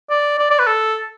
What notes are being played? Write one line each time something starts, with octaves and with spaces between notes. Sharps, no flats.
D5
D5
D5
B4
A4